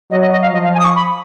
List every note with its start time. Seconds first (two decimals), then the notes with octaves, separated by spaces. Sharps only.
0.11 F#3 D#5
0.21 D#5
0.32 D#5
0.42 F5
0.53 F3 D#5
0.64 F5
0.74 G#5
0.79 D#6
0.85 C#6
0.95 B5